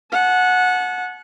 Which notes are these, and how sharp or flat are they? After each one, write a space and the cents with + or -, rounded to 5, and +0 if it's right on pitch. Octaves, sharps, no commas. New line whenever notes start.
F#5 -15 A5 -40